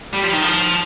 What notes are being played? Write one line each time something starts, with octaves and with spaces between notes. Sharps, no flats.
G3
F3
D#3
F3